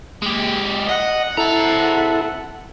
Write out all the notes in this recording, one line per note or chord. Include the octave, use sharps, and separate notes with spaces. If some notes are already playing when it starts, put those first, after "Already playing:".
G#3 G4
D#5 F#5
C4 E4 A4 A#5